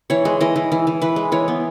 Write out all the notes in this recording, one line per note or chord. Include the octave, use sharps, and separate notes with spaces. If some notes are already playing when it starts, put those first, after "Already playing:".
E3 C#5
G#3
E3 D#5
E3
E3
E3
E3 B4
G#3
E3 C#5
B3